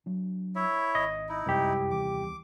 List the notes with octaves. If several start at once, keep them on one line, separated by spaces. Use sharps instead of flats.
F#3 D4
E4 C#5 E5
G#1 D#5
D#4 E4
F1 C2 F#2 G#3 G4
D#2 E3 D6